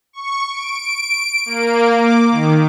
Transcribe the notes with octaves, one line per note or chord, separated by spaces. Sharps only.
C#6
D7
A#3
D6
D#3